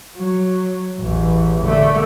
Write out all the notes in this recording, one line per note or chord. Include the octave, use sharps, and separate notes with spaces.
F#3
A1 E2
D3 A3